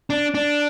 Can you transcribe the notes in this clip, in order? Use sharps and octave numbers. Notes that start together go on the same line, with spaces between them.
D4
D4